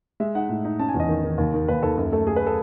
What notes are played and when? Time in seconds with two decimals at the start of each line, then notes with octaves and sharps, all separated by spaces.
0.20 G#3 E5
0.35 D#4 F#5
0.49 A2
0.65 D#4
0.79 C#4 A5
0.89 G#5
0.94 E2
1.00 D#5
1.08 D#3
1.23 D#3
1.38 D#2
1.54 D#3
1.68 D#2 B4
1.83 D#2 A4
1.98 F#2 A4
2.12 A3 A4
2.27 A3 G#4
2.36 B4
2.47 A4